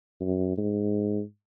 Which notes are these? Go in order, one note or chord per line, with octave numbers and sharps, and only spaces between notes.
F#2
G#2